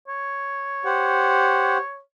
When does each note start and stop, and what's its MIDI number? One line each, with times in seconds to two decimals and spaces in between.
0.08 2.01 73
0.85 1.78 67
0.85 1.78 72
0.85 1.78 78